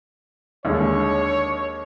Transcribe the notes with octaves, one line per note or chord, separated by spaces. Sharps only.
D#2 D3 G#3 C#5